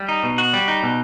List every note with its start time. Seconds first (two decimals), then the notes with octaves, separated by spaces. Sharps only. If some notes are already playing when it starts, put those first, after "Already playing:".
Already playing: G3
0.09 D#4
0.23 B2
0.38 F#4
0.54 G3
0.68 D#4
0.83 B2